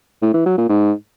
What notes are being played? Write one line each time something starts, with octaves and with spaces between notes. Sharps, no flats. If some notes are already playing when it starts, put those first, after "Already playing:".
A2
E3
F#3
A#2
G#2